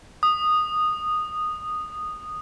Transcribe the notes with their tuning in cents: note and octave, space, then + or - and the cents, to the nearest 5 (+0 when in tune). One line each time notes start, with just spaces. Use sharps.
D#6 -10